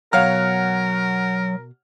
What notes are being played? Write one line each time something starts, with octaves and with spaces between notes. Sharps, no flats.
B2 F#3 A#4 C#5 F5 F#5 A#5 F6